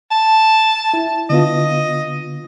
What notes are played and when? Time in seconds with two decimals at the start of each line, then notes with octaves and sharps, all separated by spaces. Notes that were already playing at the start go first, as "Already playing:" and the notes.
0.11 A5
0.94 E4
1.30 D3 B3 F4 D#5